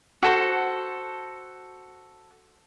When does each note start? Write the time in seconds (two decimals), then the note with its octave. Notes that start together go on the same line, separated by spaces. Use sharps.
0.23 F#4 A4 C5